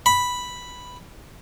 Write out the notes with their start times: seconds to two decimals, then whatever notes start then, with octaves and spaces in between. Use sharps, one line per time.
0.06 B5